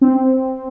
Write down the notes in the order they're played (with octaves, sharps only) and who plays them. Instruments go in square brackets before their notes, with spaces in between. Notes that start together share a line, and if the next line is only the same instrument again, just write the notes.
[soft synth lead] C4